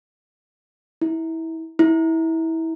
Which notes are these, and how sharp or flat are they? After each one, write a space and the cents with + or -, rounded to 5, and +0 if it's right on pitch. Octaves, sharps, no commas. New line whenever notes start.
E4 -25
E4 -25